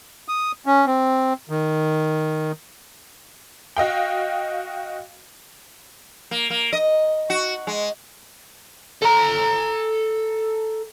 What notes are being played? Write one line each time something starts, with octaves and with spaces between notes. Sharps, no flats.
D#6
C#4
C4
D#3
F#4 D#5 F5 G5
A#3
A#3
D#5
F#4
G#3
A4 A#5